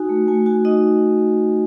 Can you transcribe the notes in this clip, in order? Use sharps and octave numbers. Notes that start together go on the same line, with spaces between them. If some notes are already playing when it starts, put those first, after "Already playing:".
Already playing: D#4 F#4 G#5
A3
A3 G#5
F#4 G#5
D#4 D#5